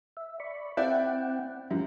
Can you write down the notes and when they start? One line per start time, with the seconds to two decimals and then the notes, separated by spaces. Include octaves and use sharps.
0.17 E5
0.40 D5 B5 C#6
0.77 C4 E4 D5 E5 F#5 G5
1.71 F#2 F3 G3 E4